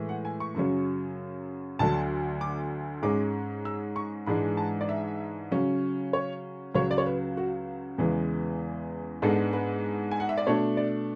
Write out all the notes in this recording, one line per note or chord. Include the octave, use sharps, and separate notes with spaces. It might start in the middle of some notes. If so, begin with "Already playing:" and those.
Already playing: A2 E3 G#3
F#5
G#5
C#6
F#2 C#3 F#3 C#4
D2 D3 F#3 A5
D6
G#2 G#3 C#4 D6
E6
C#6
G#2 E3 G#3 D4 B5
A5
D5
E5
C#3 F#3 C#4
C#5
C#2 C#3 F#3 C#5
D5
C#5
B4
F#4
E2 C#3 E3 G#3
G#2 G#3 B3 D4 A4
B4
G#5
F#5
E5
D5
B2 A3 D4 C#5
D5